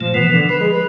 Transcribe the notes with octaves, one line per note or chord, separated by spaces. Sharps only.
A#2 F3 A3
B2 E3 F3 B3
D3
F3 B4
G#3
B4